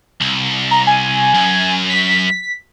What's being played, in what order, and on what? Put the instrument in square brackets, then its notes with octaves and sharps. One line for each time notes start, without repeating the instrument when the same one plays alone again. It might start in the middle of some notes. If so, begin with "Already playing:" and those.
[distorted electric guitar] C2
[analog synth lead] A#5
G#5
[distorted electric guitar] F#2
[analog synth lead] B6